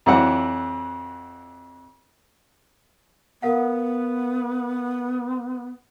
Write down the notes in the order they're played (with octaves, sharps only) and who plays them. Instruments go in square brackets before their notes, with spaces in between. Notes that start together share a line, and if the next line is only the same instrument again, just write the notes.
[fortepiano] F2 E3 F#3 D5 F#5
[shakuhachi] B3 [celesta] A#4 F5 F#5